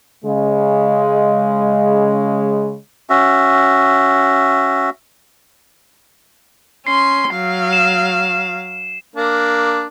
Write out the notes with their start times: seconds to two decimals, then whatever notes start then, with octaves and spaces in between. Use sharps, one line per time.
0.25 C#3 G#3
3.10 C#4 F#4 E5
6.87 C#4 C6 C7
7.31 F#3 F5
7.73 E7
9.16 A#3 D4